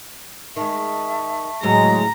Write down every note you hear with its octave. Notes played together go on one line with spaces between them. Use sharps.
D#3 G#3 E5 A5 C#6
D2 A2 C#3 F#3 G#3 A#5